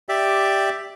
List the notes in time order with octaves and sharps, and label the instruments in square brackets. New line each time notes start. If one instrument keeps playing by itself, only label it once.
[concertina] G4 D5 E5